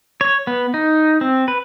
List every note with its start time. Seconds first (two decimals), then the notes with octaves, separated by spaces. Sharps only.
0.21 C#5
0.47 B3
0.74 D#4
1.21 C4
1.48 B4